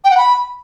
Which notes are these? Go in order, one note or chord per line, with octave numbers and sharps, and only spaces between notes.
G5
F#5
B5